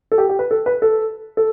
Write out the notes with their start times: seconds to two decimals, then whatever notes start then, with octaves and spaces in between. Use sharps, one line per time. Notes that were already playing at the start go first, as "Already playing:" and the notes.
0.12 A4
0.18 G4
0.29 G4
0.39 B4
0.51 A4
0.66 B4
0.82 A4
1.37 A4